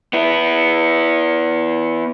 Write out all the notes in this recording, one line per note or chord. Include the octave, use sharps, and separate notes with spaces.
B3 E4